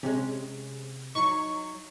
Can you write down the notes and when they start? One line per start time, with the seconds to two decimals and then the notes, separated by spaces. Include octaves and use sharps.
0.03 C3 G#3 C#4
1.15 F#3 D#4 C#6